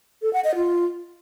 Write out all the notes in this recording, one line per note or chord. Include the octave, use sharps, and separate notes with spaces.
A4
F#5
D#5
F4